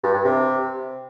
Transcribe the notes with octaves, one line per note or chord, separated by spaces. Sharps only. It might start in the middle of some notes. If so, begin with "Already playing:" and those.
G2
G2
C3